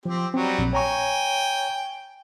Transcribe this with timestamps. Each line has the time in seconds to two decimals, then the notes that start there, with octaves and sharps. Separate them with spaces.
0.05 F3 C4 G4
0.34 F#3 G3 C4
0.59 A#1
0.73 C#5 G5 G#5 A#5 C#6